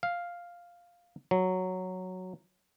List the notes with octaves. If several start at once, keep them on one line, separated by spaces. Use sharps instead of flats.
F5
F#3